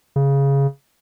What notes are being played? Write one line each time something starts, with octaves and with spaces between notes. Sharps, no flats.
C#3